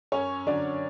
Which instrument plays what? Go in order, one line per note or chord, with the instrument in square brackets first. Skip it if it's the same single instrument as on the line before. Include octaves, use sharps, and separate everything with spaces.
[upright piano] F#2 C#4 C#5
D3 F#3 D4 D5